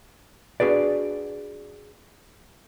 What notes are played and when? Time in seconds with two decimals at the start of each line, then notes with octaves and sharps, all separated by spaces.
0.60 D4 F#4 G#4 B4 D5